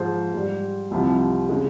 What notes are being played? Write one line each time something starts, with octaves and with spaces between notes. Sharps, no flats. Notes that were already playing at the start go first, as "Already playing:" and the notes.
Already playing: G#2 F3 G#3 C5
G#2 G3
C2 C3 F3
C#3 G#3